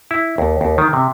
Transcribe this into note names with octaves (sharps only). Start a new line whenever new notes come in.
E4
D#2
D#2
D#3
C3